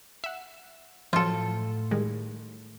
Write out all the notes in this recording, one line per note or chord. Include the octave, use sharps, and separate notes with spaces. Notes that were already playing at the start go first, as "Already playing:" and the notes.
E5 F#5
A2 F3 F#3 F4 A4
D#3 G3 G#3